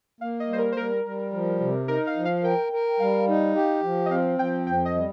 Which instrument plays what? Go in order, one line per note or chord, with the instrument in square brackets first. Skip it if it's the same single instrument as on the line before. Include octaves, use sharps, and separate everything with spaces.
[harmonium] A#3 [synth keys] F5
[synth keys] D#5
[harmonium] G3 [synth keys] C5
[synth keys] A#4
C5
[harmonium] G3 [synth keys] A#4
[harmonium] G3
F3
C3
[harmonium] D#4 [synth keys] A#4
[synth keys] F5
[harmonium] F3
[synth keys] F5
[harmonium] A#4 [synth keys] G5
[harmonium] A#4
[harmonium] G3 [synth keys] F5
[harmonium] D#4
G4
F3
[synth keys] D#5
[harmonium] C4 [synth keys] F5
[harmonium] F3 [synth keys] G5
[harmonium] F2 [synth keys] G5
[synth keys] D#5
[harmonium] G3